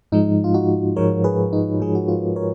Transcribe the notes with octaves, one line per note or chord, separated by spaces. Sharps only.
G#2 F3 G#3 D#4
F4
D#4 F#4
G#2 F3 G#3 A#4 C#5
G#4 B4
D#4
G#2 F3 G#3 G#4
F#4
F4
A#4 C#5